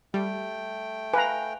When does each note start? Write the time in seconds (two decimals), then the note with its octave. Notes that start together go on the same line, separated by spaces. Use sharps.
0.14 G3 A3 G5
1.13 B4 F5 G#5 A#5